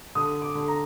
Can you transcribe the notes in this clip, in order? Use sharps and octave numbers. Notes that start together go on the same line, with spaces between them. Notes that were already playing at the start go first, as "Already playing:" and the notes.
D3 D#6
D6
D3
A#5